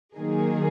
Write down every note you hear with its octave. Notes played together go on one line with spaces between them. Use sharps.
D#3 F#3 A#3 D#4 G#4